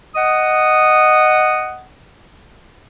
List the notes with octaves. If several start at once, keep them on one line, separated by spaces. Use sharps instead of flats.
D#5 F#5 D#6